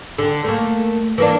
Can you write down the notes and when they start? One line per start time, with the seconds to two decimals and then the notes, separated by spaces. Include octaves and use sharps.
0.18 D3
0.44 A3 A#3
1.18 E3 A#3 D4